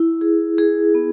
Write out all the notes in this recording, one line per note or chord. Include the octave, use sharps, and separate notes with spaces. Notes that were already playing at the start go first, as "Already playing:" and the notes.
Already playing: E4
G#4
G#4
B3